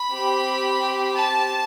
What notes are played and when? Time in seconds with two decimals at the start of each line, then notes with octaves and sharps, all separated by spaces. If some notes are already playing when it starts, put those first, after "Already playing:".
Already playing: B5
0.12 C4 G4
1.16 A5